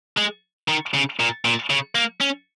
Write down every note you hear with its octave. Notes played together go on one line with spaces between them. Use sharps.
G#3
D#3
C#3
A#2
A#2
C#3
A#3
C#4